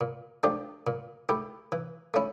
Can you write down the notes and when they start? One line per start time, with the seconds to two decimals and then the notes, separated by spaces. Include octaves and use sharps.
0.01 A#2
0.43 F3 A3 D4 G4
0.87 A#2
1.29 A3 E4 G4
1.72 E3
2.14 A3 C#4 E4